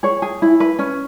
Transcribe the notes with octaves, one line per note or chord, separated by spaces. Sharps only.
G#4 C#5
G#4
E4
B4
C#4